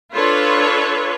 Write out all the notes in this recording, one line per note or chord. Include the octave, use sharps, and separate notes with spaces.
D4 F4 A4 B4 C#5